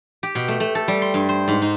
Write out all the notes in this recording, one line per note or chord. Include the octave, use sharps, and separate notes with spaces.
G4
B2
A3
A3
A4
G3
C6
G2
C5
G#2
D#4